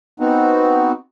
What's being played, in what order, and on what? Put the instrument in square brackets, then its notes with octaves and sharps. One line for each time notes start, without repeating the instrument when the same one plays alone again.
[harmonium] B3 C4 D#4 F#4